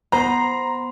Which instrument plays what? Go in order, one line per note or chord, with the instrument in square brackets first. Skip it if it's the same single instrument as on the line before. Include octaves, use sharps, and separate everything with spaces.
[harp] B3 C5 [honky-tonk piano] A#5